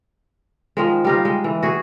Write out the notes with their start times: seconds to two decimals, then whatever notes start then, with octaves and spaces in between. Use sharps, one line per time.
0.77 D#3 F3 G#3
1.05 G3 D#4 F4
1.25 G#3
1.44 E3
1.63 F#4 G#4